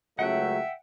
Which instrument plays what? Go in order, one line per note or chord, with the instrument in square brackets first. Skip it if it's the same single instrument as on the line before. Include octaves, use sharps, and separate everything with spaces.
[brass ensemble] C#2 F#3 A3 [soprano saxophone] E5 [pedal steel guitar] F#5 G5 F#6